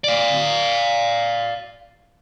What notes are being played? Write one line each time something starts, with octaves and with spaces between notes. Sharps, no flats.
D5 F5